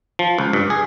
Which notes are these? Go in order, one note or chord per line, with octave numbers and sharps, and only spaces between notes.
F3
C#2
G2
G#4